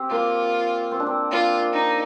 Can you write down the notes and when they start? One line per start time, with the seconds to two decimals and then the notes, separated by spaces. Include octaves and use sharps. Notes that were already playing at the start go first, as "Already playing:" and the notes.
Already playing: C4 G4
0.10 A#3 F4
0.91 C4
1.00 D4
1.07 C4
1.32 A#3 F4
1.73 D#4